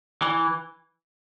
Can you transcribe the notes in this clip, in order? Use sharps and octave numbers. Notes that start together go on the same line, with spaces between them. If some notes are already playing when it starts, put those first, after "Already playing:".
E3